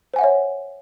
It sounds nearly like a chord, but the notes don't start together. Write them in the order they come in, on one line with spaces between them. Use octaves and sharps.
C5 G#5 F#5 E5 C#5